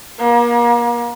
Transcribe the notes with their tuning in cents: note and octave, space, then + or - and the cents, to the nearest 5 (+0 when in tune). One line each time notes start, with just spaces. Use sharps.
A#3 +35